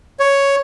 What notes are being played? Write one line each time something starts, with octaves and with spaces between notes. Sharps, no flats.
C#5